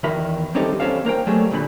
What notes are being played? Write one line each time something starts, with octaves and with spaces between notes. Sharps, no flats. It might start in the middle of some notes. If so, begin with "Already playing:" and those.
E2 D#3 F#4 A#4 E5 B5
G3 C4 C#4 D#4 G4 A4
E2 C4 C#4 G4 A4 F5
A#3 A#4 C5 G5
F#3 G3 A3 G#4
D2 A#2 D3 B5